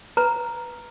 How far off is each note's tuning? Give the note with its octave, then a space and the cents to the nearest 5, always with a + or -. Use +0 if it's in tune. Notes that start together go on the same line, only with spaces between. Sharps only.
B4 +0 A#5 +0